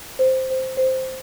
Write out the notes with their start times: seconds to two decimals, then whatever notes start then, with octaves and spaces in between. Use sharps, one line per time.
0.19 C5
0.50 C5
0.77 C5